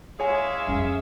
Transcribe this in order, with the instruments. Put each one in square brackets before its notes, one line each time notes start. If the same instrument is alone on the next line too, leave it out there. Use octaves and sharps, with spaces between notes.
[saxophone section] G#3 E4 G#4 [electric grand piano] C#5 G#5 [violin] E5 F5
[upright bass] F2 C#4